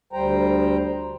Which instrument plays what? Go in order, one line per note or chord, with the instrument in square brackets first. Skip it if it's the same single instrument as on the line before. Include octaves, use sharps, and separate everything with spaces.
[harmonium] D2 G3 C5 G5 A#5